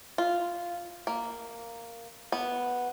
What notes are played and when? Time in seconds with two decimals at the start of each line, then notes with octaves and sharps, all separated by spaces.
0.18 F4
1.07 A#3
2.32 B3